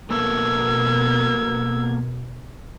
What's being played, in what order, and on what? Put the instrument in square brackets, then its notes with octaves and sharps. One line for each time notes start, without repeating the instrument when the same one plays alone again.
[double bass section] B2 [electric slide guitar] A#3 B3 A4 [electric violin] A#4 G#6 [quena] E6